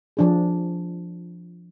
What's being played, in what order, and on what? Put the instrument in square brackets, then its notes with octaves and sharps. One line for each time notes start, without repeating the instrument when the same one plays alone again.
[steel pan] F3 D4 G#4